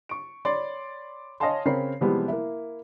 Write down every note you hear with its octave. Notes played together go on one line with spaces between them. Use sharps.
C#6 D7
C#5 D5 B5 C6
C#5 D#5 F5 G#5 A5 C6
C#3 C4 A#4 C#5 B5 C7
C3 E3 F3 G3 G#3 B3
A#3 E4